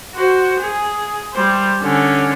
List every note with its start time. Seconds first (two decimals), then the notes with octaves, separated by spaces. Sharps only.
0.15 F#4 C5
0.60 G#4
1.33 G3 C5
1.82 D3 C#4